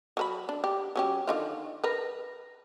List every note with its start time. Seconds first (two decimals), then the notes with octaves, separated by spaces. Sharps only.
0.17 F#3 A#4 B5
0.49 D4
0.64 G4
0.96 F#3 C#4 G4
1.27 D3 D#3 F4
1.84 A#4 B4